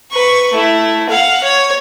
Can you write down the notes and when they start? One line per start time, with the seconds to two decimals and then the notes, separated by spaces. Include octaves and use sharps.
0.12 B4 C#6
0.54 A3 E4
1.09 F5 F#5
1.44 C#5